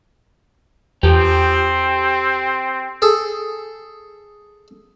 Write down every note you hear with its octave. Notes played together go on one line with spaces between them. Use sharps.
E2 C4 G4 A4
G#4 A4